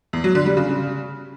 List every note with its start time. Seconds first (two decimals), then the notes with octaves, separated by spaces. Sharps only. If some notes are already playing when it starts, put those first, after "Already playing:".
0.13 E2
0.24 F#3
0.35 D3
0.46 G3
0.57 C#3